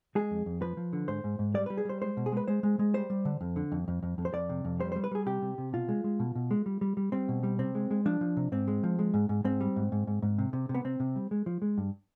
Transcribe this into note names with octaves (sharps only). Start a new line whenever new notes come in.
G#3 G#4
F2
F2
F3 B4
F3
D3
G#2 C5
G#2
G#2
G3 D5
G3 B4
G#4
G3 C5
G#3 C5
B2
G#4
G#3 B4
G#3 C5
G#3
G#3
G3 C5
G3
D3
F2
D3
F2
F2
F2
F2
C5
F2 D5
C3
F2
G3 C5
G3 C5
B4
G3 G#4
C3 G4
C3
C3
B2 F4
G#3
G#3
B2
B2
G#3
G3
G3
G3
G3 C4
B2
G3
C3 C4
G#3
G#3
F3 D4
F3
C3
G#2 C4
G#3
F3
G#3
G#2
G#2
G#2 C4
G3
G#2
G#2
G#2
G#2
C3
C3
C3
B3
C3 C4
C3
G3
G#3
F3
G#3
G2